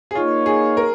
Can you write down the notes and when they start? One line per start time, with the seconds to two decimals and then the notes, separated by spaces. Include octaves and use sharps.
0.11 G#4
0.15 A#3 D#4 F4 C#5
0.46 G#4
0.77 A#4